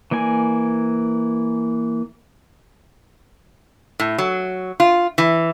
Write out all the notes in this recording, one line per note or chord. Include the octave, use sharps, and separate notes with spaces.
E3 A#3 D5 G#5
A2
F#3
F4
E3